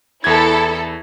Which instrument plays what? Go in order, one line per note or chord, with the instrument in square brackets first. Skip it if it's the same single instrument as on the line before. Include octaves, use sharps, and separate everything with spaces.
[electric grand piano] E2 G#6 [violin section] E4 A4